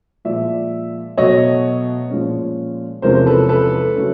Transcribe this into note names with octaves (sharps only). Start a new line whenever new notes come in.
A#2 F3 G#3 D5 E5
B2 F#3 A3 C#5 D#5
A#2 F3 G#3 C#4
E2 C3 F3 G#3 C#4 A#4 C5
A4 B4
A4 B4
C#3 F#3 A3 C#4